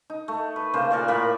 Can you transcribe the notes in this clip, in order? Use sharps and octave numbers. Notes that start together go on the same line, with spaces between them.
D#4
A3
B4
C#3 A#3 C5
A#2 A#4 D5 C#6
A2 A#3 B5 D6